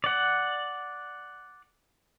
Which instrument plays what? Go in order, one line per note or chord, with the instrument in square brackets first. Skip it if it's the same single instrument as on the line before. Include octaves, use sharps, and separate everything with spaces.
[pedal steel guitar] D5 F#5